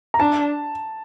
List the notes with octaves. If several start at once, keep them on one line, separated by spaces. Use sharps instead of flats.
A#5
D4 A5